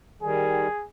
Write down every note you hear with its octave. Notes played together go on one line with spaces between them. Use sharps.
D#3 G3 G#4